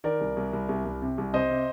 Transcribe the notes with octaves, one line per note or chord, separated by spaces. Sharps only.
D#3 A#4 D5
C2
C2
C2
C2
C2
C3
C2
C3 C5 D#5
C3